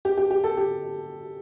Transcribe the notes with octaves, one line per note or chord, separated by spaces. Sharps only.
G4
G4
G4
A4
G4